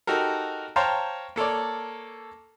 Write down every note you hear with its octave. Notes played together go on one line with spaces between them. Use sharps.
D#4 F#4 G4 A4 A#4
C5 C#5 F5 G5 A5 A#5
A#3 A4 C#5 D5